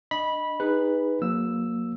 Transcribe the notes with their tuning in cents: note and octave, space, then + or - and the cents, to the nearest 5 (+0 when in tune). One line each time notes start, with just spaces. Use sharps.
D4 +20 D#5 +0 B5 -15
D#4 +0 G#4 -30 B4 +0
F#3 -35 A#3 +0 E6 +0